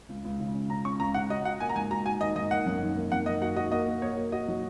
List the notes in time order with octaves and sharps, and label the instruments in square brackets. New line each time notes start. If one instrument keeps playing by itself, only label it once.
[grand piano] C#2
C#2
C#3
C#4
[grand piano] C#3 [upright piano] A#5
[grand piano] C#4 [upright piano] C#6
[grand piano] C#2 [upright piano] A#5
[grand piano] C#3 [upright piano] F#5
[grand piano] F#4 [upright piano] D#5
[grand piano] F#4 [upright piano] F#5
[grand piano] A#3 [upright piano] G#5
[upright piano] A#5
[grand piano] G#2 [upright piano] G#5
[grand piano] F#4 [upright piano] A#5
[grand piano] F#4 [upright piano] G#5
[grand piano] D#3 [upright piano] D#5
[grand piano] G#2 [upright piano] D#5
[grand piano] A#3 [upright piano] F#5
[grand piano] F#2
D#3
A#3
[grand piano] F#2 [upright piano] F#5
[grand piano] A#3 [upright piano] D#5
[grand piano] F#4 [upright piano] F#5
[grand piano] F#4 [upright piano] D#5
[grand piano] A#3 [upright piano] D#5
[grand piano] A#3
[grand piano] A#3 [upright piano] C#5
[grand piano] F#4
[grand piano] F#4 [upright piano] D#5
[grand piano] F#3